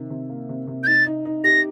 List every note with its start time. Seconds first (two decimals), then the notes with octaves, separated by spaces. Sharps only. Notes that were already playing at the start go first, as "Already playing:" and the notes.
Already playing: C3 D#3
0.10 C3
0.30 A#3
0.49 C3
0.67 C3
0.83 G6
0.87 D#4 A6
1.06 D#4
1.25 D#4
1.44 G4 A#6